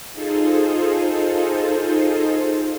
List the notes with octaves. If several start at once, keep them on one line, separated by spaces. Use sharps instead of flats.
D#4 F4 G#4 A4 C5